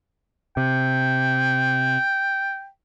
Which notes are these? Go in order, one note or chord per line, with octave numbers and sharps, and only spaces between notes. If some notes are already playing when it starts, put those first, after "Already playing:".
C3 G5